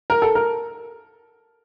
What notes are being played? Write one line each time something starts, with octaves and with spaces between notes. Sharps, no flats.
A#4
A4
A#4